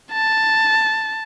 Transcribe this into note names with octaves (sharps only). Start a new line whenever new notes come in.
A5